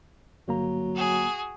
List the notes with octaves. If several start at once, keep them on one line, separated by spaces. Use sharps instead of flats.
G1 F#3 A#3 A#5
F#4 G#4